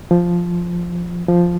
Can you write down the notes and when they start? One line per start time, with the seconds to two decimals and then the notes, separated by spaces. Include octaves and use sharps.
0.11 F3
1.28 F3